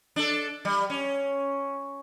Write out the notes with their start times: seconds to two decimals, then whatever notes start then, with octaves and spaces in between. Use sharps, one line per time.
0.16 D4 A4
0.65 G3
0.90 C#4